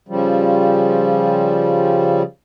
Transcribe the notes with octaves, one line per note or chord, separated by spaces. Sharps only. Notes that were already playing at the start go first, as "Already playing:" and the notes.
C#3 F3 G3